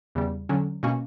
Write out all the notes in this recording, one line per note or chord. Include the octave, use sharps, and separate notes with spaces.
E2 C#3 G3
D3 F#3 C#4
B2 A#3 C#4 F#4